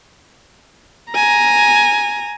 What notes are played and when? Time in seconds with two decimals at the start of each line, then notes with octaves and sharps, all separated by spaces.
1.12 G#5 A#5